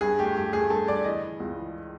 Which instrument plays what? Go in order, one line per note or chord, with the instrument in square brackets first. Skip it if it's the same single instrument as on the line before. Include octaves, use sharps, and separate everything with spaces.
[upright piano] G2 G#4
A3 G4
G2 G4
A3 G#4
G2 A4
G2 D5
E3 D#5
E3
C#2
E3